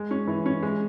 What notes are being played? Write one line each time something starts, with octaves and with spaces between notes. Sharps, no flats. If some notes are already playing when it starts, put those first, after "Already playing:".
Already playing: G#3
C#4
E3
C#4
G#3